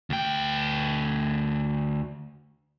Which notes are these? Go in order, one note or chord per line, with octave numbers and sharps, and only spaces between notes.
D2 G5